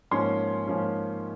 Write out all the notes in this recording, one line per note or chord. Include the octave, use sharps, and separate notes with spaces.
G#2 F3 A#3 C#4 C6
G#2 F3 A#3 C#4